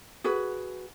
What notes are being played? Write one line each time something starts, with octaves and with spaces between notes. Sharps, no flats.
F#4 G#4 B4